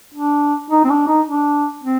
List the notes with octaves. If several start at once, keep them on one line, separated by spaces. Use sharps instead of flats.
D4
D#4
C4
D4
D#4
D4
C4